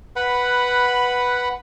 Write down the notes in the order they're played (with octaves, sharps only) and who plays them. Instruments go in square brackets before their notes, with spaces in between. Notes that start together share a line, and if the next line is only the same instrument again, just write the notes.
[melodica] B4 F#5 B5